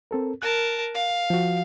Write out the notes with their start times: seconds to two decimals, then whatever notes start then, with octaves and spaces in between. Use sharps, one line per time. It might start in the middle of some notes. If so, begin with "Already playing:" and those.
0.11 C4 A4 A#4
0.42 A#4 A5 F#6
0.95 F5
1.30 F3 F#4